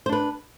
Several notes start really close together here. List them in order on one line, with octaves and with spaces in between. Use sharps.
C5 D4 B4